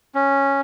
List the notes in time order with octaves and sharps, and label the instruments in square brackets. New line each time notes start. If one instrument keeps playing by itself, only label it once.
[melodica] C#4